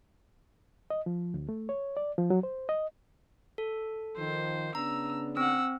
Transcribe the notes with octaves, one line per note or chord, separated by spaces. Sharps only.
D#5
F3
D2
A3
C#5
D5
F3
F#3
C5
D#5
A4
D#3 F3 C5
C#3 B3 D4 A#5 E6
C4 F#5 E6